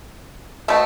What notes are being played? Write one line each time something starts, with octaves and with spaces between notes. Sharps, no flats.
B2 A3 E5